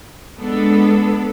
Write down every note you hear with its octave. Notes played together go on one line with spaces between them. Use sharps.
G#3 B3 D4 A4